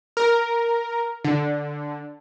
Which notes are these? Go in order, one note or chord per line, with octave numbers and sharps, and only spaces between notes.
A#4
D3